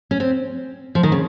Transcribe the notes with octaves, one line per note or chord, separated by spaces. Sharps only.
C#4
C4
F3
D#3
C#3